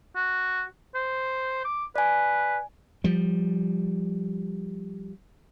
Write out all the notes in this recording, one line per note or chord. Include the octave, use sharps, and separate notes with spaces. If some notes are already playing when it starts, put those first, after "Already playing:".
F#4
C5
D6
B4 D5 G#5
F3 G3